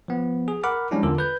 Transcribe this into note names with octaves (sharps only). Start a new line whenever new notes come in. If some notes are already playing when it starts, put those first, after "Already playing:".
F3 B3
G#4
A#4 F#5 B5 D6 F6
F3 G3 G#3 C#4 D4 E4
E2 D3 F4 A4 A#4
B4 G6